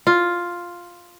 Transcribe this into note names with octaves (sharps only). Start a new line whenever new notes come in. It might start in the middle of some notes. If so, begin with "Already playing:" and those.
F4